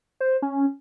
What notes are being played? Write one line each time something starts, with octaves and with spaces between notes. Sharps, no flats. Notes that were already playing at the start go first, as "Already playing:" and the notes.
C5
C#4